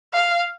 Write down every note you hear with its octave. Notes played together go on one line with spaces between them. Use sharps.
F5